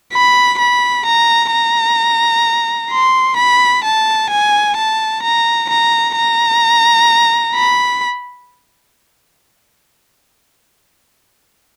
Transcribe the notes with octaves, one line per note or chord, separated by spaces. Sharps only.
B5
B5
A#5
A#5
C6
B5
A5
G#5
A5
A#5
A#5
A#5
B5